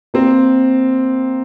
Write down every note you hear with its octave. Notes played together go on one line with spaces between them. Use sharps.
A#3 C4